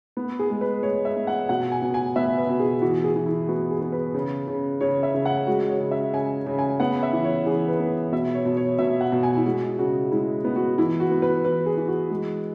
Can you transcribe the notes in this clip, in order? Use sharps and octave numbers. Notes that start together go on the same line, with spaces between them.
B3
G#4
G#3
B4
G#3 C#5
E5
B3
F#5
B2 F#5
G#5
B2
G#5
B3 E5
B4
B2
G#4
E3 F#4
G#4
E3
E4
B3 F#4
G#4
B3
B4
C#3
C#3
C#3 C#5
E5
C#3
F#5
G#3 F#4
C#5
C#3
E5
C#3 G#5
C#3
G#5
B3 F#5
E5
E3
C#5
E3 G#4
B4
B3
B2 E5
C#5
B2
C#5
B2 E5
F#5
B2
G#5
E4
G#3 F#4
C#3 F#4
G#3 E4
B3
F#4
E3 E4
F#4
B3
B4
E3 B4
G#4
E3
F#4
G#3